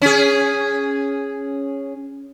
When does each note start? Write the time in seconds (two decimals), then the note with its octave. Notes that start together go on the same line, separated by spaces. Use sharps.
0.02 C#4 G#4